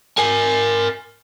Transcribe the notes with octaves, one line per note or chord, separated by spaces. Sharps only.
A#4 G#5